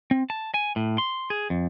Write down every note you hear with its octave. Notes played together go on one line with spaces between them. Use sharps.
C4
A5
G#5
A2
C6
G#4
F2